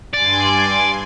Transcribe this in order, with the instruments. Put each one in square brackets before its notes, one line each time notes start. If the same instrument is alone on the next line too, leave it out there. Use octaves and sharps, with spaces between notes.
[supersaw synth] G2 G#5 C6 [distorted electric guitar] D5